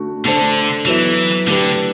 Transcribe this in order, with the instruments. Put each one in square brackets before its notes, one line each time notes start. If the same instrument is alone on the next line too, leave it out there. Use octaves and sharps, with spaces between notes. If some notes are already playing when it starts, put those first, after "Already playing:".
Already playing: [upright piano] D3 A3 F#4
[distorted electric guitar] D3 [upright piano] A3 D4 A4 C5
[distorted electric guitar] E3 [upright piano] F#3 B3 E4
[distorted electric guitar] D3 [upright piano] A3 D4 G4 B4